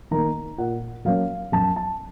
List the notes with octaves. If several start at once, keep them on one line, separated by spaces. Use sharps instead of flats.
D#3 A#3 A#5
A#2 F#5
F#3 A#3 C#4 F5
F#2 A5
A5